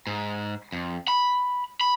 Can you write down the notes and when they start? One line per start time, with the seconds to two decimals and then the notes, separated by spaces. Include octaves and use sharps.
0.07 G#2
0.72 F2
1.08 B5
1.81 B5